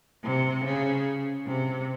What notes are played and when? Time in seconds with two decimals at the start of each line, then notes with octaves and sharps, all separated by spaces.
0.24 C3
0.65 C#3
1.47 C3